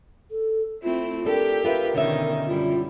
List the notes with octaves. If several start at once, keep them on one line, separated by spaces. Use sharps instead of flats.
A4
A3 C4 E4 F4
D4 G4 A4 A#4
F4 B4 E5
B2 D3 D#3 C#4 D#4 E5
F#2 G3 E4 F4